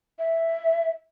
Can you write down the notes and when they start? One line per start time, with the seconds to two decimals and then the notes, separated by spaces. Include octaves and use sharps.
0.19 E5